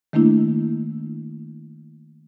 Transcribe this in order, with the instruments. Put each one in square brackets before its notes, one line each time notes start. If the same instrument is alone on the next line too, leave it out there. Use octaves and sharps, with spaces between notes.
[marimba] D#3 A3 A#3 D4 E4